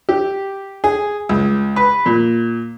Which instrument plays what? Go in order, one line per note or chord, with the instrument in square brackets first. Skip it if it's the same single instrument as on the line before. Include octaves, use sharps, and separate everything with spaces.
[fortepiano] G4
G#4
C#2
B4
A#2